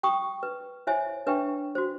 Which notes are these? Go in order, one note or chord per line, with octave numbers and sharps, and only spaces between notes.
G5 C#6 D#6
B4
E4 C5 C#5 E5 G#5
D4 B4 C#5 E5 G5 C#6
F#4 C5